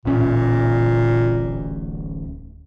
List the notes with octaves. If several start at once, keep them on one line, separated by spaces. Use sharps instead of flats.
D1 A1 A#2 C#4